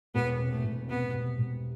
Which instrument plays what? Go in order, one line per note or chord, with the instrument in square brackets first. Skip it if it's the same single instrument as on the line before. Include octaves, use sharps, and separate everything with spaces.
[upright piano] E1 [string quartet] B3
[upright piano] C3
[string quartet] A3
[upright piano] E1
[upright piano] C3 [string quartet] B3
[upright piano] E1
E1